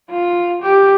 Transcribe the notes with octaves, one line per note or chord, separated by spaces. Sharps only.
F4
G4